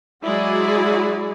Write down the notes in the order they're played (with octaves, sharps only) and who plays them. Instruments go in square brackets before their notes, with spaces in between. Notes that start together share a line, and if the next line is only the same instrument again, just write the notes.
[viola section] F#3 G#3 E4 F#4 G#4 D5